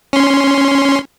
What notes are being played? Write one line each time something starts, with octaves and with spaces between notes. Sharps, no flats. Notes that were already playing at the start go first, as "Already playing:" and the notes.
C#4 C6